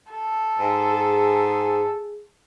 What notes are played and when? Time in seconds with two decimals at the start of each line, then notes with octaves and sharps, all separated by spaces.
0.12 A4
0.59 G#2
0.92 G#4